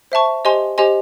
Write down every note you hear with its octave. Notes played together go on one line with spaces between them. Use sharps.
C5 E5 A5 C#6
G4 C5 D#5 G#5 C6
G4 C5 D#5 G#5 C6